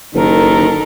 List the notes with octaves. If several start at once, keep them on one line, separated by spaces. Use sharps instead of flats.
F#1 D#3 A4 A#4